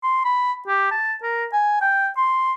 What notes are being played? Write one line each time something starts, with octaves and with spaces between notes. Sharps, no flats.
C6
B5
G4
A5
A#4
G#5
G5
C6